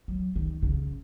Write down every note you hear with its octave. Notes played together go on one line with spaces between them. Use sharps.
F#3
D#3
C#3